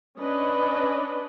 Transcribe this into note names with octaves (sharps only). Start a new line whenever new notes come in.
C#4 D4 B4 D#5